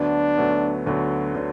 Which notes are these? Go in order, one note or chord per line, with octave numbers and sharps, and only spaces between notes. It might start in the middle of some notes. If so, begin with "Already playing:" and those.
Already playing: D2 D3 F#3 B3 D4
D2 D3 F#3 B3
D2 D3 F#3 B3
D3 F#3 B3